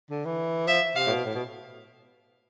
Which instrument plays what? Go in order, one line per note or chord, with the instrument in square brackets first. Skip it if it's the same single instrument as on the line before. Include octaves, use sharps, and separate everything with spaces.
[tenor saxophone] D3
E3
[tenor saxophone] F3 [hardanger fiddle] E5
[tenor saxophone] C3 [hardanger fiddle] F5
[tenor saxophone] A2
B2
A2
B2